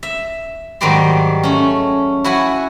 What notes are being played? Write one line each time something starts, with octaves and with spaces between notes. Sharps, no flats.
E5
G#2 D#3 F#3 G3 D5 C6
A3 C#4
E4 F#4 F#5 G#5